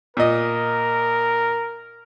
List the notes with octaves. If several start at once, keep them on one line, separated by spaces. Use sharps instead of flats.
A#2 A#4 D#5